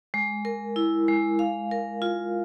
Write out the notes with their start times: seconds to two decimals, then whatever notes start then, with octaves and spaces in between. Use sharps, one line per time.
0.14 G#3
0.45 A#4
0.76 E4
1.08 G#3
1.39 F5
1.71 A#4
2.02 F4